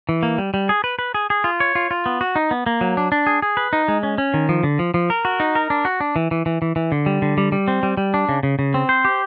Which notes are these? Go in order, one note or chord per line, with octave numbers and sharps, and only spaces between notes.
E3
A#3
G3
G3
G#4
B4
B4
G#4
G#4
F4
C#5
F4
F4
B3
F#4
D#4
B3
A#3
F#3
D4
D4
G#4
G#4
B4
D#4
G#3
C#4
C#4
D#3
F3
D3
F3
F3
A#4
F#4
D#4
A#4
D4
F#4
D4
E3
E3
E3
E3
E3
D3
G3
D3
G3
G3
C4
G3
G3
D4
C#3
C#3
C#3
C4
C5
G4